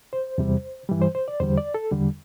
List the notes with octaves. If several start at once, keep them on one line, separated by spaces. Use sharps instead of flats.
C5
E2 C3 G3
G2 E3 G3
C5
C5
D5
E2 D3 G3 C5
D5
A4
E2 D3 G3